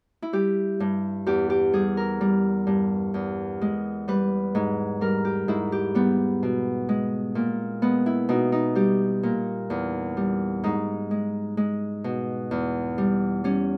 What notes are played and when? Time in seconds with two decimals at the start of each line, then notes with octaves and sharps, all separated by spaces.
0.22 E4
0.33 G3 G4
0.80 G2
1.26 E2 G4
1.50 G4
1.73 G3 G#4
1.97 A#4
2.21 G3
2.67 G2
3.14 E2
3.61 G#3
4.08 G3 B4
4.55 G#2
5.01 G3 A#4
5.25 G4
5.48 G#2 E4
5.72 G4
5.95 G3 B3
6.43 B2
6.89 G#3
7.35 A#2
7.82 G#3 B3
8.06 E4
8.29 B2 D#4
8.52 D#4
8.75 G3 G4
9.23 A#2
9.70 E2
10.17 G3
10.64 G#2 D#4
11.11 G#3
11.57 G#3
12.04 B2
12.51 E2
12.98 G3
13.44 G3 C#4